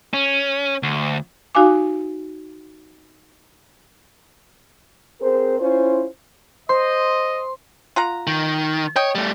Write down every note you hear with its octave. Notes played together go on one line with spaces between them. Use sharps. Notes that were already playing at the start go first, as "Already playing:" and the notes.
C#4
D2
D#4 F#4 F5 G#5 D6
C4 G#4 A#4 C5
C#4 E4 F4 C5
C5 D#5 C6
F4 F#5 A#5
D#3
C#5 D#5 G5
G3 A3